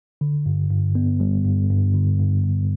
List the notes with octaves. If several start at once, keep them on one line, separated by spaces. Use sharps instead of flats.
D3
G2
G2
B3
G3
G2
G2
D3
G2
G2